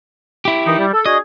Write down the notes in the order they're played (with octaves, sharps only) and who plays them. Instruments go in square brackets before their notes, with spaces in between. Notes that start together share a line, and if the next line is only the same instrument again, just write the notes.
[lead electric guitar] E4 G4
[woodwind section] D#3 E3 D#4
G3
A4
[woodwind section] D4 F#4 G#4 [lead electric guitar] D#5